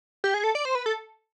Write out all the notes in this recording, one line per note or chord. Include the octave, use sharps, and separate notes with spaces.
G4
G#4
A4
D5
C5
B4
A4